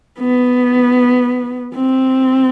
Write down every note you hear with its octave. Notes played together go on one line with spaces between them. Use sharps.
B3
C4